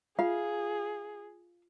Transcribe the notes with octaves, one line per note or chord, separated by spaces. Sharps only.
F4 G#4 F5